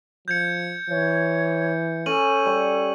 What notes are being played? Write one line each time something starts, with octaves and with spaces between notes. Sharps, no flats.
F3 G6 G#6 C#7
E3 C#5
C#4 A4 C#6 D#7 F#7
G3 C#5